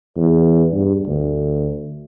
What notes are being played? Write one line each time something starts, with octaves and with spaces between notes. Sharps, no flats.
E2
G2
D2